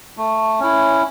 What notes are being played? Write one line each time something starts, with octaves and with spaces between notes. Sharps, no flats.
A3
C#4 E4